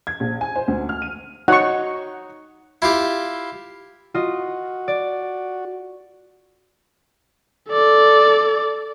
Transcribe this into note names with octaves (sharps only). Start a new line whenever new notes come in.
G#6
A#1
G#5
C5
D2
F6
D#7
D#4 F#4 C#5 F#5 C#6
E4 F4 G4
F4 F#4 D#5
D5
A4 D5